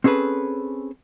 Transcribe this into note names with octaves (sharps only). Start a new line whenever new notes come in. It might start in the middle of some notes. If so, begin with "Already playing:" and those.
C4 C#4 G#4 A4 B4